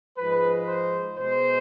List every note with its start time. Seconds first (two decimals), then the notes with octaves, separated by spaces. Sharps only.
0.17 G#2 F3 G#3 B4
0.67 C5
1.18 B2 G#3 C5